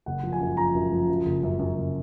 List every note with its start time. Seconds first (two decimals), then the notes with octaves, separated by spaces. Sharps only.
0.06 F#1 F#5
0.23 F3
0.32 G#5
0.41 F#2
0.57 F3 A#5
0.75 F#2
0.92 F3
1.09 F#2
1.26 F#1
1.43 F#2
1.59 F#2
1.77 F#1